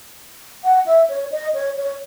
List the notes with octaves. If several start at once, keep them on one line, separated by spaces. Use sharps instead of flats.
F#5
E5
C#5
D#5
C#5
C#5